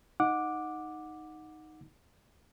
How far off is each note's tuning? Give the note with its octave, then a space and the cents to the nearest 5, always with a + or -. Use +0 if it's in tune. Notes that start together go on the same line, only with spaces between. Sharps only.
D#4 +0 F#5 -15 D6 +5